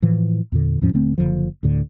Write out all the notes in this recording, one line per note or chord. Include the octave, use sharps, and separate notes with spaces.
A2 E3 F3
E2 A#2 D3
E2 A2 F3 C#4
D#1 D3 A3 C4
F#1 C#2 D3 F3
D2 A2 D3